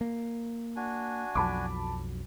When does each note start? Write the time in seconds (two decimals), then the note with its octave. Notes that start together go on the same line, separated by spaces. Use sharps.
0.01 A#3
0.76 D4 F#4 G#5
1.35 B1 F2 F#3 A5 B5 D6